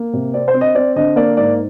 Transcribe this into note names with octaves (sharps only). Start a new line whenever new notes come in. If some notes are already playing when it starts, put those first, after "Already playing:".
Already playing: A#3
C3
C4 D5
C5
C4
D#5
C4 D5
D3 D#5
A#3 D5
G#2 D5